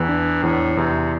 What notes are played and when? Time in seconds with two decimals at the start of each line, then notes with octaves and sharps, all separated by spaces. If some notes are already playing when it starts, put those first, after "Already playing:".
Already playing: E2 E3
0.09 D4
0.43 E2 A2
0.77 E2 C3